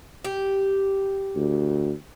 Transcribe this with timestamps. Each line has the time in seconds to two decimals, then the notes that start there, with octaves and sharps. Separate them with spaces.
0.24 G4
1.36 D2